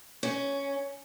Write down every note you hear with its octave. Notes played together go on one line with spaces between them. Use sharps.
C#4